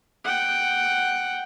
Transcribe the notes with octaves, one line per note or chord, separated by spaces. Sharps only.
F#5 G5